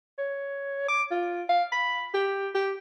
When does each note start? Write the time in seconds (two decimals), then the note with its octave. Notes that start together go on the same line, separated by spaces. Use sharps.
0.18 C#5
0.88 D6
1.11 F4
1.49 F5
1.72 B5
2.14 G4
2.55 G4